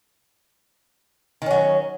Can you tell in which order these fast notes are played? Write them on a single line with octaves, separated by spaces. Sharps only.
D#3 C#4 F#3